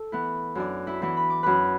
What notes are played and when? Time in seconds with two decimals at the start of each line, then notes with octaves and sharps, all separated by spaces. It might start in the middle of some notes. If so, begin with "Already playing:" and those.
Already playing: A4
0.12 E3 B3 E4
0.55 F#2 D4 D5
0.87 E4 E5
1.02 E3 B3 E4
1.17 B5
1.30 D6
1.43 F#2 B4 B5